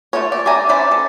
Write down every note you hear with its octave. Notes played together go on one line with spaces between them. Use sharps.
A3 F4 A4 C#5
D5
D4 D5 E5 G#5 A#5
C#4 C5 D5 E5 B5
A4